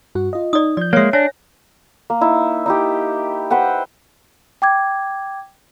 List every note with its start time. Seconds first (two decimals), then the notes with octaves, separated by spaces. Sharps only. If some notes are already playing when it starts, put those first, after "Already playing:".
0.15 G2 F#4 F#5
0.33 F4 D#5
0.53 D#4 D5 D#6
0.77 F3 D5 G6
0.93 G#3 A#3 C#5 E5
1.13 D4 C#5 G#5 A#6
2.10 A#3
2.21 D#4 E4
2.66 D#4 E4 G4
3.50 B4 C5 F#5 G5
4.62 G5 D6 G#6